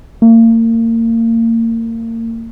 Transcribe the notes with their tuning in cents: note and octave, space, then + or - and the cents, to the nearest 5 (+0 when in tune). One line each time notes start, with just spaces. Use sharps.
A#3 -35